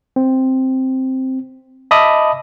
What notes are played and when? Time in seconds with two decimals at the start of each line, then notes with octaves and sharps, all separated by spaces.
0.16 C4
1.91 D#5 E5 A5 B5 D6 D#6